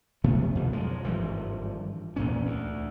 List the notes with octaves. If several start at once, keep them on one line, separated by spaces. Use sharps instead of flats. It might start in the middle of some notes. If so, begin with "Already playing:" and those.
C3 F3 A3 B3
F2 B2
F3 F#3 G#3
G#1 G2 E3 F3
E2 A#2 C#4
D2